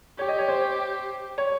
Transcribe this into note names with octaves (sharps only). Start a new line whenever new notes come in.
G4 C#5
D#5
C#5
C5
C#5